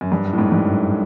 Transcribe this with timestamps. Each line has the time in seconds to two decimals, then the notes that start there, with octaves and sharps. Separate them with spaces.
0.01 F#2
0.12 G2
0.25 F#2
0.33 A2
0.38 G#2
0.52 G2
0.65 F#2